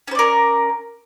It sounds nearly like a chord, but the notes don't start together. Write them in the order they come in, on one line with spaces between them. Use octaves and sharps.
C#4 C5 D5 A#4